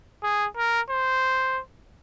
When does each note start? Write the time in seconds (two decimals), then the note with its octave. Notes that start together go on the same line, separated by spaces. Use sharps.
0.23 G#4
0.57 A#4
0.90 C5